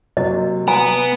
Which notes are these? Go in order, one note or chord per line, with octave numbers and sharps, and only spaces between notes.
C3 F#3 A#3 D#5
B3 G#5 A#5